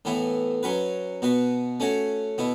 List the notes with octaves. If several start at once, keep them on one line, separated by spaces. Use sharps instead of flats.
A2 E3 B3 E4
F#3 C#4 F#4 B4
B2 B3 F#4 B4
A3 C#4 F#4 C#5
B2 B3 E4